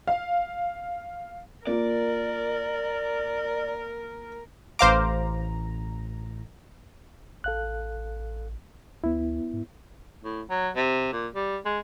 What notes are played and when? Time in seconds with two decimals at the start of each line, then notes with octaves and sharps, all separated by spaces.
0.07 F5
1.67 A#3 F4 A#4 D5
4.79 A1 C5 F5 A#5 D6
7.44 A1 A4 F5 F#6
9.04 D2 B3 E4
9.53 G#2
10.24 A2
10.50 F#3
10.76 C3
11.12 A#2
11.35 G3
11.65 G#3